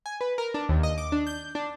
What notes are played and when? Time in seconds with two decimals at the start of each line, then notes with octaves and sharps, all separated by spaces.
0.06 G#5
0.21 B4
0.38 A#4
0.54 D4
0.69 D#2
0.83 D#5
0.98 D6
1.12 D4
1.27 G6
1.55 D4